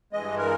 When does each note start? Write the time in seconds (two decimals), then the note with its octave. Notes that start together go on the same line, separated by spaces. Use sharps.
0.13 G2 E3 G#3 D#5
0.37 A#4